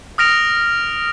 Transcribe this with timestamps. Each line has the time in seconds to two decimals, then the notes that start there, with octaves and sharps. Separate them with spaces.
0.18 D#6 F6 A#6 D7 F7